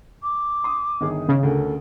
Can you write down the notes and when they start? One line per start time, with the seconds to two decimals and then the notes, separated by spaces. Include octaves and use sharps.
0.23 D6
0.64 C6 D#6
1.01 G1 D#3 G#4
1.28 C#3
1.43 D2 A4 A#4